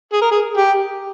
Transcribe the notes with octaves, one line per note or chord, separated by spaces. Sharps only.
G#4
A#4
G#4
G4